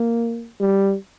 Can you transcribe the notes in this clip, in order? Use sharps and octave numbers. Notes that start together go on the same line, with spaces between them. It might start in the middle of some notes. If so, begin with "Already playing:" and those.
Already playing: A#3
G3